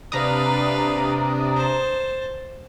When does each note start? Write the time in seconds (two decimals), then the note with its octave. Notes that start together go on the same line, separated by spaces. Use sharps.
0.12 C3 D4 B4 D5 F5 A#5 D#6
1.56 C5 A5